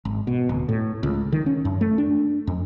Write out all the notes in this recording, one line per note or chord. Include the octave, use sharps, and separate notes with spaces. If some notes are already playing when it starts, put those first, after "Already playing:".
G#1
B2
D1
A2
C#2
D#3
C#4
F#2
A3
D4
F2